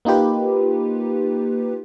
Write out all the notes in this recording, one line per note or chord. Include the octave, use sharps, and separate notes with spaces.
A#3 D#4 F4 G4 B4